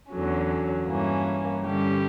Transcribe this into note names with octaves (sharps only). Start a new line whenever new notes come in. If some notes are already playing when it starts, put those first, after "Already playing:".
E2 D3 F#3 C#4
G2 E3 A#3 C#4
G2 D3 G3 C#4 G4